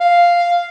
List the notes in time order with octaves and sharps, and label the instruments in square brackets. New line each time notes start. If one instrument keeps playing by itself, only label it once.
[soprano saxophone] F5